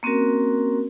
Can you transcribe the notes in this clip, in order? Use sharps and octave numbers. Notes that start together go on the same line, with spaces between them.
A#3 C4 C#4 F#4 A#4